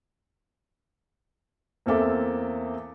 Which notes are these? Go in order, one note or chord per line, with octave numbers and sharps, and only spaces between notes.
E2 A#3 C4 A4 E5 D6